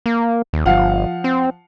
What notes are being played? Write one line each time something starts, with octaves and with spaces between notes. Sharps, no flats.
A#3
D#2
G1 F3 F5 F#5
C4